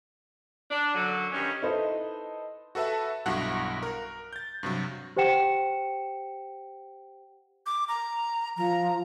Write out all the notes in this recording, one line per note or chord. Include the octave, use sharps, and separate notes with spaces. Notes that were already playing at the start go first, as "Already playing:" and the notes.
D4
F#2 D3 F#3
G2 D#3 C#4
D#4 E4 A4 B4 C5 D#5
F#4 A4 B4 E5 A5
B1 G2 E4 F#4 F#5 F#6
A#4
G6 A6
G2 C3 F#3
G4 C5 F#5 G5 C#7 E7
D6
A#5
F3 A#5